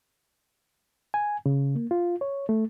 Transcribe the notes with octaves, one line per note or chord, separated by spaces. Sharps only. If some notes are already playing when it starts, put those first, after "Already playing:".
G#5
C#3
A#3
F4
C#5
A3